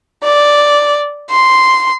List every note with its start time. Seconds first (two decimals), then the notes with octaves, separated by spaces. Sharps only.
0.24 D5
1.31 C6